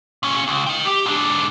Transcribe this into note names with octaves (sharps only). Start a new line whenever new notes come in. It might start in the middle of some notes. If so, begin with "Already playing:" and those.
A#2 C#4
C#2
D#5 G5
G4
G#2 D4